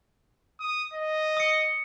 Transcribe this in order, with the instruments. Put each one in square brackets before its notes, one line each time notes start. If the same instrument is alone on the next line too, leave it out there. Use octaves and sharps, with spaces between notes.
[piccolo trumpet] D#6
D#5
[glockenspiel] D#6 C#7